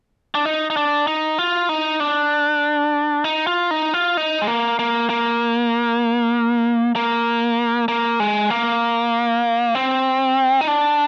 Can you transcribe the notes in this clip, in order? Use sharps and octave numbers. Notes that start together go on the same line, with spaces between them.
D4
D#4
D#4
D4
D#4
F4
D#4
D4
D#4
F4
D#4
F4
D#4
G#3
A#3
A#3
A#3
A#3
A#3
G#3
A#3
C4
D#4
D4